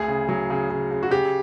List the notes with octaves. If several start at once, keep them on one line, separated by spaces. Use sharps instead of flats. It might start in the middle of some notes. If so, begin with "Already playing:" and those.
Already playing: D2 G#4
C#3
F#3
C#3
C#3
C#3
F#4
C#3 G4